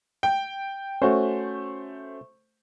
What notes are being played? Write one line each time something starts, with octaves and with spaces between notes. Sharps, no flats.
G5
A3 C#4 F#4 C5